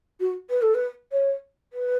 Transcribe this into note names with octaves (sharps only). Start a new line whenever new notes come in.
F#4
B4
A4
B4
C#5
B4